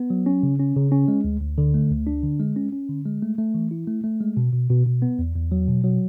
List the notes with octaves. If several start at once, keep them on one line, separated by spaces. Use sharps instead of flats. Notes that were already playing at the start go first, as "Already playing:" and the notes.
Already playing: B3
F#3
C#4
C#3
C#4
C#3
C#4
G#3
D2
D2
D3
A3
D2
D4
D3
G#3
C#4
C#4
D3
G#3
A3
A3
E3
E4
A3
A3
G#3
B2
B2
B2
B2
B3
E2
E2
F#3
B2
F#3